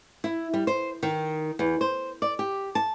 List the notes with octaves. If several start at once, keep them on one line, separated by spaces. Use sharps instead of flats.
E4
G3
C5
D#3
E2
C5
D5
G4
A5